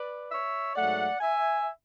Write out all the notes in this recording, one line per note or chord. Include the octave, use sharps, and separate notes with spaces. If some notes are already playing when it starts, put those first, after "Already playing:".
Already playing: B4 D5
C#5 E5
G#2 F#3 A3 D5 F#5
E5 G#5